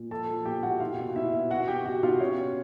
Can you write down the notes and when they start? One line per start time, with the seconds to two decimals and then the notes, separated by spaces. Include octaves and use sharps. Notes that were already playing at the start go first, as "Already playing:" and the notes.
Already playing: A#2
0.10 F3 A4 A5
0.28 F3
0.45 A#2 G4 G5
0.63 A#2 F#4 F#5
0.80 B2 F4 F5
0.98 B2
1.16 B2 E4 E5
1.33 B2
1.50 B2 F#4 F#5
1.68 B2 G4 G5
1.85 B2 F#4 F#5
2.03 B2 F4 F5
2.20 B2 C#4 C#5
2.38 B2